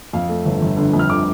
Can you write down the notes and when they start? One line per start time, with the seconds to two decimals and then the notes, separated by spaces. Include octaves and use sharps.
0.13 F2 F5
0.29 A3
0.45 G1
0.62 G1
0.77 D3
0.93 F2
0.99 F6
1.10 D3 D6